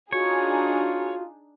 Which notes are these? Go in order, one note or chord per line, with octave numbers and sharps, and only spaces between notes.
D4 D#4 F4 F#4 G#4 C#5